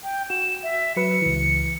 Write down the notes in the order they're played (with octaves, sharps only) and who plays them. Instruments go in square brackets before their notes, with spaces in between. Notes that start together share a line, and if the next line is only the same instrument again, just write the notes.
[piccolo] G5
[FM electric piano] F#4 [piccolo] E7
[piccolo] E5
[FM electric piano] F#3 B4 [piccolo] C#7
[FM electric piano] C#2 E3